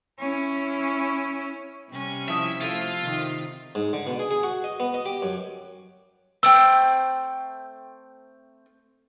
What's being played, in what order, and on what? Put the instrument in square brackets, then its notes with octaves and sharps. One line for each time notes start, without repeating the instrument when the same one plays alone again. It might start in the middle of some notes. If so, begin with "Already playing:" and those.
[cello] C#4 E4
[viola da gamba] C3 G3 C#4
[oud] F3 E4 D#5 [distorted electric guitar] E5
[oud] F3 A3 E4 [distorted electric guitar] F4
[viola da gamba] C3 D#3
[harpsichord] G#2
D3
B2
G#4
G#4
F#4
D#5
B3
D#5
G4
F#2
[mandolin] A3 C4 G5 [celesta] E6